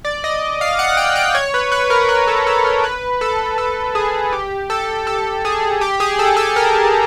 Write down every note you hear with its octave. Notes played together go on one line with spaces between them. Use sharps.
D5
D#5
F5
F#5
G5
G5
C#5
B4
B4
A#4
B4
A4
A4
A#4
B4
A4
A4
G#4
G4
A4
A4
G#4
G4
G#4
A4
A4
A#4